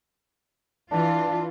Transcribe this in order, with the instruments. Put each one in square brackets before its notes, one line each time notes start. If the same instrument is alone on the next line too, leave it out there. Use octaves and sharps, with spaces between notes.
[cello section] E3 F4 [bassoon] D4